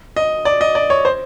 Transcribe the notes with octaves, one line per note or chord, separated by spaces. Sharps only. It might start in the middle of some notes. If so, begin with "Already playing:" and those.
D#5
D5
D#5
D5
C#5
C5